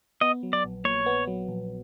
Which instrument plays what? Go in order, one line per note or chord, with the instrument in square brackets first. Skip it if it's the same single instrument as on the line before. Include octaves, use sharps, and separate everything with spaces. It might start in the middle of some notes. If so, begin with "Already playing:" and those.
[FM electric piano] B3 [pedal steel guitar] D#5
[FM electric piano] F#3
[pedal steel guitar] D5
[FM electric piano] A#1
[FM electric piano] A#2 [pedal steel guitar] C#5
[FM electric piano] B3
F#3
A#1